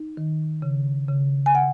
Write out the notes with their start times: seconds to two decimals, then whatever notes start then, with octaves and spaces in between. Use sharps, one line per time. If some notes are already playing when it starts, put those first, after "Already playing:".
Already playing: D#4
0.17 D#3
0.62 C#3
1.09 C#3
1.46 G#5
1.55 F#5